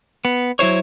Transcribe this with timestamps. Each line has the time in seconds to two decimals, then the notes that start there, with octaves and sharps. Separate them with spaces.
0.25 B3
0.59 F#3 E4 C5 C#5